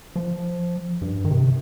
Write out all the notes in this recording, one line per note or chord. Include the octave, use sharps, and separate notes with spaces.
F3
G2
D#3
C3